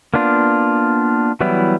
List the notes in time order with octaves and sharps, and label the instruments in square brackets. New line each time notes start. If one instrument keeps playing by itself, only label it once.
[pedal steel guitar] A#3 B3 D4 F4
E3 F#3 G3 B3 E4